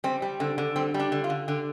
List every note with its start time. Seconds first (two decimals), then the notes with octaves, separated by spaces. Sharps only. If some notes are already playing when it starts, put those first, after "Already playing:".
0.04 G3 C4
0.22 G3
0.40 D3 C4
0.58 D3
0.76 G3 C4
0.94 G3
1.00 D4
1.12 D3
1.24 F4
1.30 D3
1.48 D3 G4